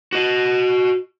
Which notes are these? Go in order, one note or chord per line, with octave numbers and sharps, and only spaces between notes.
F#4 D#5